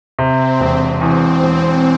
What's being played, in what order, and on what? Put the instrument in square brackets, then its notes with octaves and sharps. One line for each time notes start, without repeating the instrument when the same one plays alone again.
[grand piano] C3 [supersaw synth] C4
[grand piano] E1
[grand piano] E2 [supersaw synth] C4
[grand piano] E1